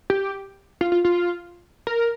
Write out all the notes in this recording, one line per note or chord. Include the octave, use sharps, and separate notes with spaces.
G4
F4
F4
F4
A#4